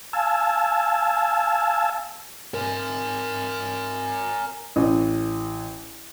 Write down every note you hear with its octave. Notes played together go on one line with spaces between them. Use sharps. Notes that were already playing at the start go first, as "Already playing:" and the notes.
F5 G#5 A5 E6
A#4 G#5
A1